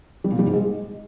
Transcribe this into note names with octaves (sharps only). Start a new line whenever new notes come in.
G3
A#2
G3
G#2
G#3